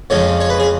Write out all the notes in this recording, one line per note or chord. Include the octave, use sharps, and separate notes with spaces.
F2 C#3 F3 G#3 C#5
C#5
B4
G#4